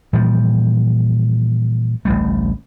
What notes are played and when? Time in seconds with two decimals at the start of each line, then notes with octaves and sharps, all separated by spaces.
0.13 A#2 E3 F3 G3
2.05 A1 D2 G3 A3